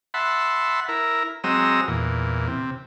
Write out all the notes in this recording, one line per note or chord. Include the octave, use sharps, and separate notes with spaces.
E5 F#5 A5 B5 C6
E4 A#4
F#3 G#3 C4 D#5 A#5 E6
E2 A#2
C3